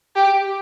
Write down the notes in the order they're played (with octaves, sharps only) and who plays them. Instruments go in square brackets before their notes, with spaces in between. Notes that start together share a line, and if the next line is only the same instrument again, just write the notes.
[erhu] G4